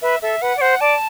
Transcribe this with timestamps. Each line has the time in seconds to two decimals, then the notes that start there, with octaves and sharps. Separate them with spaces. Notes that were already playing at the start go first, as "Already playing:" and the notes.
0.02 B4 E5
0.22 A4 E5
0.41 B4 F#5
0.57 D5
0.61 C5 F#5
0.81 D5 A5